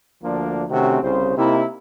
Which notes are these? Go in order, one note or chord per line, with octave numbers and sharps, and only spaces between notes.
D2 F3 A#3 D4
C3 D#3 A3 C4 C#4 F#4
C2 C#3 C5
C3 A#3 D#4 E4